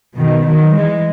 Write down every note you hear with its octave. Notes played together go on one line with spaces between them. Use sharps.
B2 D#3
D#3 F#3
E3 G#3